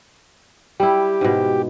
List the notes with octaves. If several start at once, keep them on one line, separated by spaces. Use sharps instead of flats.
G3 E4 G4
G#2 B2